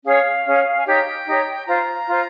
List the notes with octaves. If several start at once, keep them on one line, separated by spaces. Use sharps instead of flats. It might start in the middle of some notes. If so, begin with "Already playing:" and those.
C#4 G#4 C#5 F5
C#4 G#4 C#5
G#5
D#4 G4 C#5 G5
D#4 G4 C#5
F4 C5 A#5
F4 C5